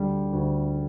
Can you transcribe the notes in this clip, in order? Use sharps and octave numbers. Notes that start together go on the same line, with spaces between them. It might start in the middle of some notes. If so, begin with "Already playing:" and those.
Already playing: D2 D3 G3
D2